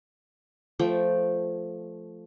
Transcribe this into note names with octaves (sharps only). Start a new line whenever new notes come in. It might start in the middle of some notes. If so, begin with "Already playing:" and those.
F3 A3 G5